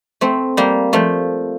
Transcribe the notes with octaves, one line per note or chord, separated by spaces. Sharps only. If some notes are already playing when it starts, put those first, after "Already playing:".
A3 C4
G3 A#3
F3 A3